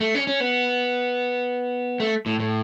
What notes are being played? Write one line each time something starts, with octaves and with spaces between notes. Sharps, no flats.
A3
C#4
C#4
B3
A3
A2
A2